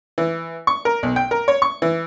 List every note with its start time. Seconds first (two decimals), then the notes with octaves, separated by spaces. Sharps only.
0.18 E3
0.67 C#6
0.85 A#4
1.03 B1
1.16 G5
1.31 A#4
1.48 C#5
1.62 C#6
1.82 E3